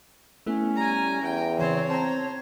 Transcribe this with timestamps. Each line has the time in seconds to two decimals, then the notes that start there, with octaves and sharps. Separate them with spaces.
0.46 A3 B3 C#4 E4
0.76 G3 G#5 A#5
1.22 E2 G5
1.59 C#3 E3 C4 C5 C#5
1.90 C4 C5 A5 A#5